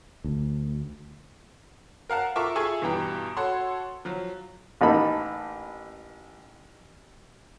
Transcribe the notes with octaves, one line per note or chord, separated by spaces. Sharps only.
D2
A#4 F5 F#5 A5
F4 A4 A#4 E5 C#6 D6
F4 G#4 A4 E5 G#5 C#6
G2 B2 E3 G4 A#5
F#4 A4 C#5 C6
F3 F#3
A1 A#3 D#4 A5 B5